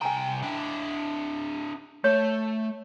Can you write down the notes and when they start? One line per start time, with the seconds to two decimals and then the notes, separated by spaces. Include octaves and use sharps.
0.02 C2 G5 G#5 A#5
0.43 D4 E4
2.04 A3 C#5